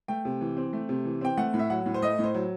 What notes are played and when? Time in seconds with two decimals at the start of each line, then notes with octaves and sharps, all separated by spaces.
0.08 A3 G5
0.25 C3
0.41 E3
0.57 C4
0.73 A3
0.89 C3
1.05 E3
1.21 C4 G5
1.38 A3 F#5
1.54 A2
1.59 E5
1.70 F#3 F#5
1.86 A2
1.94 C5
2.02 A3 D#5
2.19 A2 C5
2.35 F#3